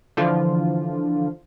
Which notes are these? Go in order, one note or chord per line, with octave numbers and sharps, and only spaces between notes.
D3 E3 F3 F4